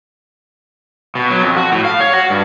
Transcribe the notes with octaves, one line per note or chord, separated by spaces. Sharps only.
B2
F#3
F2
F#4
A2
F5
C#5
F#4
G2